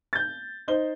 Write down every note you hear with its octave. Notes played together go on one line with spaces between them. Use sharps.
G6 A6
D#4 C5 G7